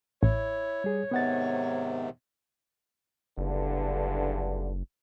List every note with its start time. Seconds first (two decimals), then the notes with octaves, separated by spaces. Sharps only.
0.23 A1 E4 C#5
0.84 G3 G#4
1.11 G#2 C3 D#3 B3 F#5 A6
3.38 F#1 E2 G2 D3